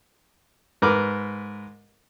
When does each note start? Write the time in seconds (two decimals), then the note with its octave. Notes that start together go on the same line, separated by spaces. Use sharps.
0.82 G#2 A#4 B4 D6